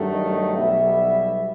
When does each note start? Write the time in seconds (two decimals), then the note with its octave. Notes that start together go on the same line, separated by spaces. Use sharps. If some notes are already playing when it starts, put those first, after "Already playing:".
Already playing: G2 D#3 F#3 A3
0.12 D#5
0.56 B1 B2 G3 E5